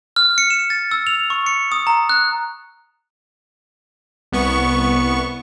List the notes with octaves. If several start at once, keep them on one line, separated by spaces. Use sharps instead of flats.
F6
C#7
E7
A6
E6
F7
C#6
C#7
D#6
A#5
F#6
C2 B3 C#6